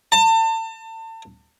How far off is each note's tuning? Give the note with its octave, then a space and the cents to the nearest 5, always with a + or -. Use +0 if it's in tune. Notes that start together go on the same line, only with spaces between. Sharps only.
A5 +35